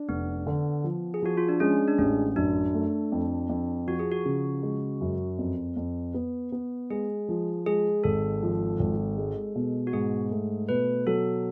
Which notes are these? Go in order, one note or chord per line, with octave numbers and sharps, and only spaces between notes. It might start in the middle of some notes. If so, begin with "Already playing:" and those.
Already playing: D4
F1 B3
D3
F3
G#4
F3 F#4
F4
D4
G#3 C#4
D4
A1 C#4
F#2 D4
A3
F2
F2
F3 F#4
G#4
F#4
C#3
G#3
F#2
F2
F2
B3
B3
G#3 G#4
F3
G#3 G#4
G#1 A4
F3
G#1
G#3
B2
F#4
G#2 G#4
A3
B2 B4
F#3 A4